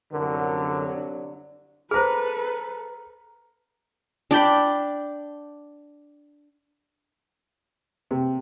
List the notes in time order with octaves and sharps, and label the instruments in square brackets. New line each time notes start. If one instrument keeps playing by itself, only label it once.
[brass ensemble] C2 F#3 [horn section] F#2 D3 [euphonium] A#4
[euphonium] D4
[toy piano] G#4 C5 [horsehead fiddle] A4 B4 [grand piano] A#5 F6
[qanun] D4 D5 G5 B5
[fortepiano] C3